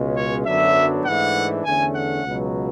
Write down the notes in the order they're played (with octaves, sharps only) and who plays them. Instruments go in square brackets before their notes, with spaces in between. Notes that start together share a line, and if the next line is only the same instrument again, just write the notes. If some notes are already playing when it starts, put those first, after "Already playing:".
Already playing: [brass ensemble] C#2 B2 G#3 C#4
C#5
F#2 D3 F#3 B3 D4 E5
G#2 E3 A3 D4 F#5
E2 D3 A3 C#4 G#5
F#5
C#2 B2 F#3